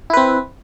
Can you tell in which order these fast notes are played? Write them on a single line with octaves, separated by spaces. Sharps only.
E4 B4 C4